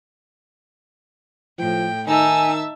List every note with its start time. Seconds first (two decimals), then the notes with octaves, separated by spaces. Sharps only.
1.59 A2 F3 G5
2.08 D#3 D#4 E5 G#5 A5 E6